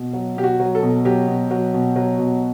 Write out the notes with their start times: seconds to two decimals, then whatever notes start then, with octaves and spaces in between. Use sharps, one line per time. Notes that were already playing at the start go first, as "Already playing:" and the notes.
Already playing: B2
0.13 F#3
0.36 B2 G4
0.44 F#4
0.60 F#3
0.75 A4
0.82 B2
1.05 F#3 G4
1.27 B2
1.51 F#3
1.74 B2
1.96 F#3
2.19 B2